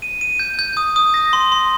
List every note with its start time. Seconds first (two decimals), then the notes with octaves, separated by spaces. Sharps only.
0.02 D#7
0.21 D#7
0.40 G6
0.59 G6
0.77 D#6
0.96 D#6
1.14 A#6
1.33 C6
1.52 C6